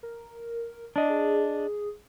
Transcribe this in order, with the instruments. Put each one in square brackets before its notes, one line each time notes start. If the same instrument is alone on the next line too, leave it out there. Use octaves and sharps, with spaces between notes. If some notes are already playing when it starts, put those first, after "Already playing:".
[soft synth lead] A#4
[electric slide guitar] D4 D#5 [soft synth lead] D5
[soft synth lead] G#4